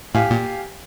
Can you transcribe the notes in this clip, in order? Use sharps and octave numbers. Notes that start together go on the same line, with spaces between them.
A2 G4 F5 G#5
A#2